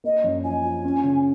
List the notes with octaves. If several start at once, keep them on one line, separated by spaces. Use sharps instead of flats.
A#3 D#5
F#2
F3 G#5
F4
C#4
C#3